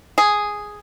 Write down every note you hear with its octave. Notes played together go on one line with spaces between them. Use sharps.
G#4